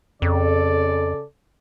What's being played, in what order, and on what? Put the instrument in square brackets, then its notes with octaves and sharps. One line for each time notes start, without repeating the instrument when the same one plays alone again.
[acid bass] F2 [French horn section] C#3 A4 [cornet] D5